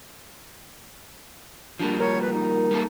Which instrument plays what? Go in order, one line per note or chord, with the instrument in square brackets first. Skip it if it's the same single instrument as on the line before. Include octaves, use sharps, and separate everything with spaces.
[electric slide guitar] F3 G3 A#3 [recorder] D4
[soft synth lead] A#4 [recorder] C#5
[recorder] B4
D#4
[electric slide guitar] G3 A#3 A4